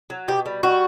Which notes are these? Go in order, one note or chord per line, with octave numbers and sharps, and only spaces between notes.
F#3
B2 G4
G3
G3 F#4